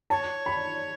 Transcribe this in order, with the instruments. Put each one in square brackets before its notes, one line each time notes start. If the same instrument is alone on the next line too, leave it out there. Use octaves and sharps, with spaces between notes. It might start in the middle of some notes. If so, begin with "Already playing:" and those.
[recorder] C#5 [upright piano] A5
[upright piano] B5